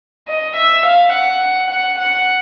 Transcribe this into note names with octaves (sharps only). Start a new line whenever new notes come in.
D#5
E5
F5
F#5
F#5
F#5